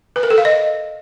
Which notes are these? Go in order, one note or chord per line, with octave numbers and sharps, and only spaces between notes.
B4
A#4
A4
F5
D#5